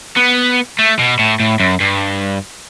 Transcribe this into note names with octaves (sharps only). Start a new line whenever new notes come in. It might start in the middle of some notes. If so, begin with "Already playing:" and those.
B3
A3
B2
A2
A2
F#2
G2